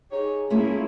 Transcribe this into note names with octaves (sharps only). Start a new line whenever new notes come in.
D#4 G4 G#4 C#5
A3 A#3 C#4 E4 F4 E5